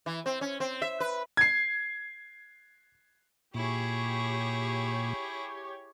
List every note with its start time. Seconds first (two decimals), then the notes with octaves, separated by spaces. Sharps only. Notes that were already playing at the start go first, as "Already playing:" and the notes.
0.06 E3
0.26 C4
0.41 C#4
0.60 C4
0.82 E5
1.00 B4
1.37 G#6 C7
3.54 A#2 E4 G4 G#4 C#5